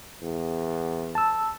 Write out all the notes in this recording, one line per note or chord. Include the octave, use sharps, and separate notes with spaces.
E2
A5 E6